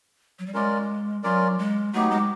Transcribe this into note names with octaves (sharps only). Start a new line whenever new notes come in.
F#3
G3
G#3 C#4 F4 A#4 D5
F#3 C#4 F4 A#4 D5
G#3
F#3 A3 B3 D#4 G4
G#3